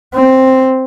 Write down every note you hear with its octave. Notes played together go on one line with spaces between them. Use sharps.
C4